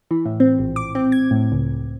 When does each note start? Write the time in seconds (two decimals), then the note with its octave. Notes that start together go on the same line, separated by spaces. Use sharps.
0.11 E3
0.25 A2
0.40 C4
0.59 A#1
0.76 D6
0.95 C4
1.12 G#6
1.31 A2
1.52 C#2